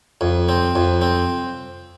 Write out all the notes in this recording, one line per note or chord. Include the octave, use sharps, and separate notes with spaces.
F2
C4
F2
C4